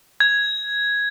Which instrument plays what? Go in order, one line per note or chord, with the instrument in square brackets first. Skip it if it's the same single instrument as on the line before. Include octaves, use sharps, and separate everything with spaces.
[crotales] G#6